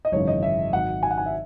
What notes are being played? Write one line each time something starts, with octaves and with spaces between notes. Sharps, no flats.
D#5
G#1 F#2 C#3 E3 C#5
D#5
E5
G#1 G#2 F#3 F#5
G#5
F#5
G#5
E5